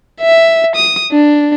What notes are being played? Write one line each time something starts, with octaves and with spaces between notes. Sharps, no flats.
E5
D#6
D4